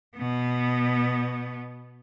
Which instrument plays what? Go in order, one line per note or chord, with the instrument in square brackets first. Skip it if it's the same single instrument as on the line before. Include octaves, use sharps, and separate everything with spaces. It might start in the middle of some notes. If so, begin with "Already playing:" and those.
[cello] B2 B3